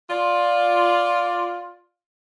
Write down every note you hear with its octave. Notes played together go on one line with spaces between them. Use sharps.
F4 D5